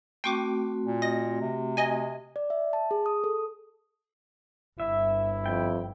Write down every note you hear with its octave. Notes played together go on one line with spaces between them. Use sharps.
A3 C4 F#4 G5 C#6 D6
A#2
D#5 A#6
C3
D#5 G#5
D5
E5
A5
G#4
D#6
A4
G1 E4 E5
F2 G5